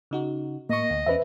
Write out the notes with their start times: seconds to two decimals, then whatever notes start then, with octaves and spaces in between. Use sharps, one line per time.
0.11 C#3 D#4 F#4
0.69 A2 A#3 D#5 C#6
0.90 D2
1.06 E2 C#4 B4 C5 E5